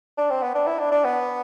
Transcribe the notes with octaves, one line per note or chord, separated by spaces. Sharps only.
D4
C4
B3
D4
E4
D4
D4
B3